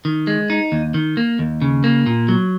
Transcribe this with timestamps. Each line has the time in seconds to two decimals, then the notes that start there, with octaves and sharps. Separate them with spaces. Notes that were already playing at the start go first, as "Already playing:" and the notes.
0.05 D#3
0.27 G#3
0.50 D#4
0.72 D#2
0.94 D#3
1.17 A#3
1.39 D#2
1.62 C#3
1.84 A#3
2.06 A#2
2.28 F#3